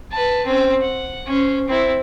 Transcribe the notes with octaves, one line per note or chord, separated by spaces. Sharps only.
B4 A5
C4 C#4
F#5
C#4 C5
C4 E4